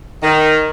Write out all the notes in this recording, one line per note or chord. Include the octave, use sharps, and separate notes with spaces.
D#3